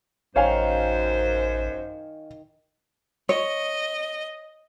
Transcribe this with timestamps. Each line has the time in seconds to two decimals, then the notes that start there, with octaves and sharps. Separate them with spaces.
0.36 A1 F#2 D#3 C5 C#5 F5 G#5
3.29 C#5 D#5